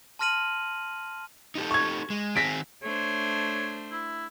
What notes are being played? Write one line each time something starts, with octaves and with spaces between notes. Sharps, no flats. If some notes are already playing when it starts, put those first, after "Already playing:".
A5 C6 F6 A#6 D#7 F#7
D#4 G4 A4
C#6 G#6
G#3
D#3 C4 G#4 A#6 B6 D7
A3 D4 C5 C#5
E4